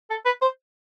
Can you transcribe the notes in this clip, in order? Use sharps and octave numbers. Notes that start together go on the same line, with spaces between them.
A4
B4
C5